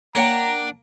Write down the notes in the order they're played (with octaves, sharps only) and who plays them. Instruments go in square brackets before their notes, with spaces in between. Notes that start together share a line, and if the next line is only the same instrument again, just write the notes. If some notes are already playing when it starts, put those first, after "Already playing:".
[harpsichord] A#3 [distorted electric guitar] D4 [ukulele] C#5 F#5 G5 [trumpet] A#5